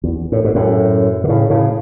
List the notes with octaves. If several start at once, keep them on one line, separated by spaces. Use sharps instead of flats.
E2
A2
G#2
F#2 A2
D3
A2 C#3
A2 C#3